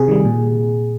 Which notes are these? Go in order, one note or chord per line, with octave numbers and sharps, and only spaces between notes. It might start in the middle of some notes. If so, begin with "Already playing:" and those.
Already playing: C3 G#4
D#3 G3
A#2